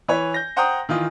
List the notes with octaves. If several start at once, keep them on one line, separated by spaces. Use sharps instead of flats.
E3 B4 C#5
G6 A#6
C5 F#5 G5 A#5 C6 D#6
D#3 E3 F4 D#6